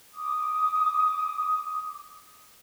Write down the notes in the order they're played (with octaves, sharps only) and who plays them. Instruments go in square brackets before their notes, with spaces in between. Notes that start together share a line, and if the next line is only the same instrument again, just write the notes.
[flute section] D6 D#6